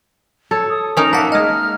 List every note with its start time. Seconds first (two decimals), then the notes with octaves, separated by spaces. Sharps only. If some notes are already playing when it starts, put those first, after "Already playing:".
0.51 A4 C#5
0.70 D#6
0.97 C#4 D#4 A#4 F7
1.13 A#3 E5 F#5 A5
1.32 G#3 D#5 F6